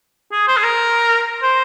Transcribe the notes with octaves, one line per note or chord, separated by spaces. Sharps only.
G#4
C5
G#4
A#4
C5